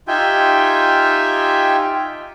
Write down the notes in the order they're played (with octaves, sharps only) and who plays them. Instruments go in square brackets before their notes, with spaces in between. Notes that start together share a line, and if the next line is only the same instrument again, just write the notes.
[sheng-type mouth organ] D#4 F4 G4 E5 G5 G#5